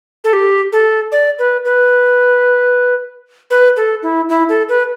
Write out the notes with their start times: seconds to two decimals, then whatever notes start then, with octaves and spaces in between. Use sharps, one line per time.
0.24 A4
0.33 G4
0.72 A4
1.12 D5
1.39 B4
1.65 B4
3.50 B4
3.77 A4
4.03 E4
4.29 E4
4.49 A4
4.69 B4